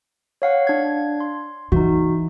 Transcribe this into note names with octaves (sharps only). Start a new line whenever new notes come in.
C#5 F5 F#5
D4 G#6
C6
E3 D#4 F#4